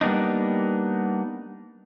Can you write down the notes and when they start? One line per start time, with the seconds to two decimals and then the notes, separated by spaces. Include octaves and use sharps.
0.01 G3 A#3 B3 D4 D#4